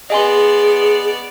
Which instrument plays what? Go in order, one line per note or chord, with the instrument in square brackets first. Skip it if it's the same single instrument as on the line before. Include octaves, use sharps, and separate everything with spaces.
[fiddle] B3 D5 [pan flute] G#4 [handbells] D#5 G#5 C6